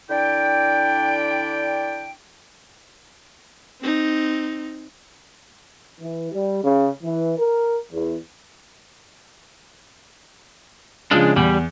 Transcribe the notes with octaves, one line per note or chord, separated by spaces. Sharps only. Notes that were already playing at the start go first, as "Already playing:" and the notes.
D3 D4 E4 D5 G5
C4 D#4
E3
G3
C#3
E3
A#4
E2
C#3 F3 G#3 D4
E2 G3